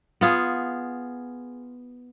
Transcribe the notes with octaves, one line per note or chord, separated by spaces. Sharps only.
B3 F4 G#4